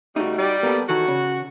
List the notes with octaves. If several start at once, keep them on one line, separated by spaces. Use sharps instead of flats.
C#3 G3 A3 D#4 F#4
G3 D5
A#3 B3 A4
D#3 E3 F#4 A4
C#3